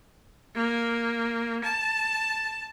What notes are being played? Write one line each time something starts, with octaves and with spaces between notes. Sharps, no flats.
A#3
A5